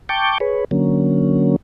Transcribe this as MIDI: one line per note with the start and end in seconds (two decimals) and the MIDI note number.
0.09 0.38 79
0.09 0.38 81
0.09 0.38 85
0.09 0.38 86
0.09 0.38 91
0.40 0.65 68
0.40 0.65 71
0.40 0.65 73
0.71 1.56 50
0.71 1.56 54
0.71 1.56 58
0.71 1.56 61